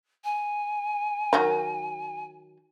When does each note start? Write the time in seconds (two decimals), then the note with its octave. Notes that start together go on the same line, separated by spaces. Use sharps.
0.24 G#5
1.33 D#3 F#3 A#4